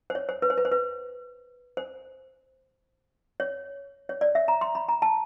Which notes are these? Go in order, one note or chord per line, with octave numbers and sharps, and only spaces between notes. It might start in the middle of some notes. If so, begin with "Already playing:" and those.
C5
C#5
C5
B4
C5
B4
C5
B4
C5
C#5
C#5
D5
E5
A#5
C6
B5
A#5
A5